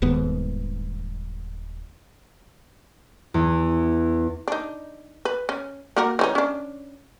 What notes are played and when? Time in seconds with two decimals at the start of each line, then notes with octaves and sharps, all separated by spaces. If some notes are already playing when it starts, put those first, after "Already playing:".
0.02 D#1 D#2 G#2 B3
3.34 E2
4.48 D4 D#4
5.25 B4
5.49 C#4
5.96 A#3 F#4 A#4
6.19 E3 C#4 D#4
6.35 C#4 D4